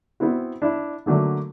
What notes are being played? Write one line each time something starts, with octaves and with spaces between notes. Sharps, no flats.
B3 C4 E4 F#4
D4 E4
D3 F#3 A3 A#3